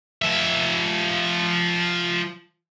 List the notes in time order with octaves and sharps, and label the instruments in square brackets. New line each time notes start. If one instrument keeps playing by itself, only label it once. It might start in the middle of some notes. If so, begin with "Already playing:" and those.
[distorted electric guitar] F3 E5